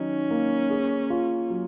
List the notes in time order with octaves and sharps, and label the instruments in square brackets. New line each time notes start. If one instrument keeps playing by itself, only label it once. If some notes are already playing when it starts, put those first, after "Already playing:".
Already playing: [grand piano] D#3 F#3 D#4 [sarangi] C#4
[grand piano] A#3
G#4
F4
F#3